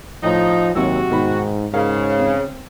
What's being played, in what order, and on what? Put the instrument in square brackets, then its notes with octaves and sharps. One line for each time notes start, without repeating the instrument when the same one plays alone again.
[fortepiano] A2 [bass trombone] F3 [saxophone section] D#4
[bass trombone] D#2 [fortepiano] C3 F#3 E6 [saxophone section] F#4
[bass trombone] G#2 [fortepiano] B2 D#3 B5
[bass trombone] G#2 [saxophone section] C#3 [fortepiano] A#4 C#5 F5
[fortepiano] C4